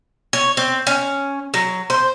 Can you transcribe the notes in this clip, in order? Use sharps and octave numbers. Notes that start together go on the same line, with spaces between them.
C#5
C4
C#4
F#3
C5